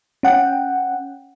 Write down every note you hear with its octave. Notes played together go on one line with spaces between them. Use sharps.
C#4 F#5 G5